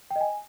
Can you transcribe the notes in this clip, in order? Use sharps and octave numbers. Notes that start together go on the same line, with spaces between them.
G5
D#5
G#5